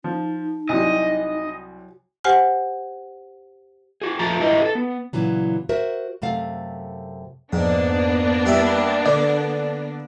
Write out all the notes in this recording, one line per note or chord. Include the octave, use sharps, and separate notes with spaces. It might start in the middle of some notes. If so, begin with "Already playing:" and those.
F3 D#4
C2 C3 F#3 D#5 G#5
G4 C5 F#5 G#5 F6
F#4 G#4
F2 F3 A3 A5 A#5
G#2 G3 E4 A#4 D#5 A#5
G#4 A4
B3
A#2 C#3 E3 F#3
F#4 A#4 C5 E5
F#2 C3 A3 F5
F2 G#2 A#3 B3 D4
G3 E4 E5
D3 D5